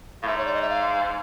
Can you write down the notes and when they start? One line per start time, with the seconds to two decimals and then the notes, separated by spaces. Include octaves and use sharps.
0.23 A2 F5
0.27 G#2 E5
0.38 C#5
0.46 D5
0.54 D#5
0.62 E5
0.69 F5